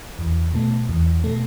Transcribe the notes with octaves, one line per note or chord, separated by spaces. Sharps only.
E2
B2 A3
E2
B2 A3